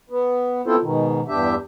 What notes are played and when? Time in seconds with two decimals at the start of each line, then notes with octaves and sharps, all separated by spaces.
0.10 B3
0.67 B3 C4 E4 F4 A4 C5
0.81 G#2 B2 D#3
1.29 E2 G2 D4 G4 E5